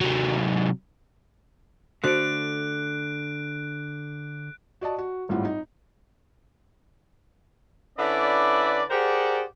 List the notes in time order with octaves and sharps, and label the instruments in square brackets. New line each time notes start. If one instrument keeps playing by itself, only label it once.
[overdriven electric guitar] C3 F#3
[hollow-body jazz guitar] D3 A3 [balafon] F#4 C5 [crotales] F#6 D7
[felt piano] F#4 D5 D#5 A5
F#4
G#1 A2 G3 F4 F#5
D#4
[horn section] D3 C#4 E4 B4 D5
G4 G#4 A#4 C5 D5 F#5